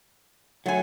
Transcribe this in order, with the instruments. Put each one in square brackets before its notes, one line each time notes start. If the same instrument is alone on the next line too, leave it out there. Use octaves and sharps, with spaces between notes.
[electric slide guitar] F#3 [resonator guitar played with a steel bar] A3 G#5